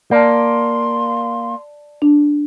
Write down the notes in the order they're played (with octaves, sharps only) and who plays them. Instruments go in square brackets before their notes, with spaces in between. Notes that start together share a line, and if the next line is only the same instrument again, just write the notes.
[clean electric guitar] A#3 [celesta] D5 A5 [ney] C6
[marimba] D4